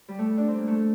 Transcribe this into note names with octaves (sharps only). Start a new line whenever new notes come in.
G3
A3
D4
C4
A#3
A3